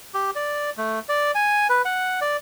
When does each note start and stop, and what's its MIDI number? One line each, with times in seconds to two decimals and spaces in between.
0.14 0.31 67
0.35 0.70 74
0.78 0.99 57
1.09 1.31 74
1.35 1.67 80
1.69 1.82 71
1.85 2.20 78
2.21 2.37 74